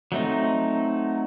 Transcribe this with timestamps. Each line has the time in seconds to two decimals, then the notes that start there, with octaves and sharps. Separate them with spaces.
0.12 F#3 A3 C4 D#4